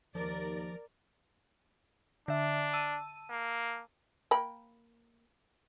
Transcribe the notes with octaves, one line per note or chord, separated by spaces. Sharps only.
D#2 F3 A#4 D5
D3 D4 E5
A5 E6 D#7
A#3
A#3 G5 B5